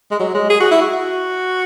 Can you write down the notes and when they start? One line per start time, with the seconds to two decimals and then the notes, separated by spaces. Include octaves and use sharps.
0.11 G#3
0.19 F#3
0.34 G#3
0.50 G#4
0.60 F#4
0.71 E4
0.82 F#4